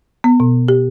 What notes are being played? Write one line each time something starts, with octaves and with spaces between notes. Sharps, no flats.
B3
B2
G4